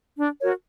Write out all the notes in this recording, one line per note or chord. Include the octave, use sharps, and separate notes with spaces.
D4
F#4 A#4 C#5